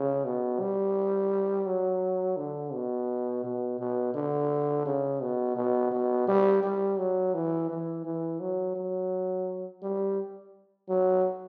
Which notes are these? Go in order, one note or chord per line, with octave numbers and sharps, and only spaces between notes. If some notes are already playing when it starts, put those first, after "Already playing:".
Already playing: C#3
B2
G3
F#3
D3
B2
B2
B2
D3
C#3
B2
B2
B2
G3
G3
F#3
E3
E3
E3
F#3
F#3
G3
F#3